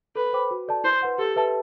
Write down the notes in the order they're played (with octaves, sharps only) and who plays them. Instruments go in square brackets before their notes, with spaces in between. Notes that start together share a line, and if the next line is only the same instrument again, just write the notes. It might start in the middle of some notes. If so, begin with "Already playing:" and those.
[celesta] A4 [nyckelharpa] B4
[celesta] C5 G5 B5 D6
F#4
A4 D5 A5
[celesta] E4 [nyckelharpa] C5
[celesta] B4 F#5 C6
[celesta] G4 [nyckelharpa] A4
[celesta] B4 E5 A5